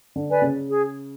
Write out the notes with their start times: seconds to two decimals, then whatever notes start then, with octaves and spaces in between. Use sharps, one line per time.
0.16 D3
0.29 B4 D5 G#5
0.42 C#3
0.68 G#4